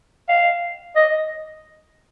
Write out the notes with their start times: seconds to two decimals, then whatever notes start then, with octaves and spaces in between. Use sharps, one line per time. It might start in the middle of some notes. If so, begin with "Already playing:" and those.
0.29 F5
0.96 D#5